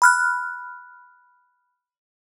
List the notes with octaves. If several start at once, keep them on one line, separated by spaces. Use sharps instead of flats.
B5 F6 F#6